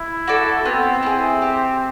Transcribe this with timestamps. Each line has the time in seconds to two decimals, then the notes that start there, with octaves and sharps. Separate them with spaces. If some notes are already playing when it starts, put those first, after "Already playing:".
Already playing: E4
0.28 F#4 A4 D5
0.65 B3 C4
1.03 E4 G#4
1.42 G4